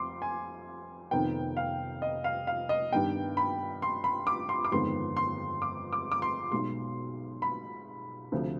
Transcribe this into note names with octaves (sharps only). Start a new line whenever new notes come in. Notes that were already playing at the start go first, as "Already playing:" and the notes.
Already playing: F2 C6 D6
G#5
F1 F2 D#3 B3 G5
F5
D#5
F5
F5
D#5
G2 D#3 G3 B3 G5
B5
C6
B5
D6
C6
D6
G1 F2 D#3 G#3 B3 C6
C6
D6
D6
D6
C6
B1 B2 G#3 C6
B5
D2 C3 F3